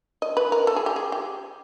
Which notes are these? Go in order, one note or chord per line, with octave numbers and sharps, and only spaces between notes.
D#5
B4
A#4
A4
G#4
G4
G#4
G4